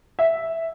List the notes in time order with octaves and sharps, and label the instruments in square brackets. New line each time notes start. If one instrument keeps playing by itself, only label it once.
[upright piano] E5